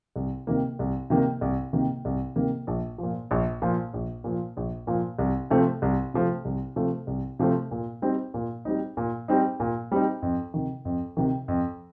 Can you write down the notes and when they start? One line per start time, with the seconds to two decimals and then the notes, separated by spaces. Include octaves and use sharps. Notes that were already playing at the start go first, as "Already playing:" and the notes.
0.16 C2
0.47 C3 D#3 A#3
0.79 C2
1.10 C3 D#3 A#3
1.41 C2
1.73 C3 D#3 A#3
2.05 C2
2.36 C3 D#3 A#3
2.67 A#1
2.98 A#2 F3
3.31 A#1
3.62 A#2 F3
3.94 A#1
4.24 A#2 F3
4.57 A#1
4.87 A#2 F3
5.19 C2
5.50 C3 F3 A3 C4
5.82 C2
6.14 C3 F3 A3 C4
6.45 C2
6.76 C3 F3 A3 C4
7.07 C2
7.39 C3 F3 A3 C4
7.71 A#2
8.02 G3 C4 D#4
8.34 A#2
8.65 G3 C4 D#4
8.97 A#2
9.28 G3 C4 D#4
9.60 A#2
9.92 G3 C4 D#4
10.22 F2
10.54 C3 D#3
10.85 F2
11.17 C3 D#3
11.48 F2